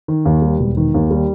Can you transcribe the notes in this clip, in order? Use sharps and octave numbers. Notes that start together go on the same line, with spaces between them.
D#3
D#2
G3
E1
D#3
D#2
G3